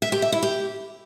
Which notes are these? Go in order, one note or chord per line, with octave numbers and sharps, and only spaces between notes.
E5
G4
E5
E4
G4